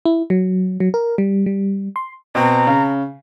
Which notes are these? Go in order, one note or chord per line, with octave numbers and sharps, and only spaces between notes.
E4
F#3
F#3
A#4
G3
G3
C6
B2 C4 A#5
C#3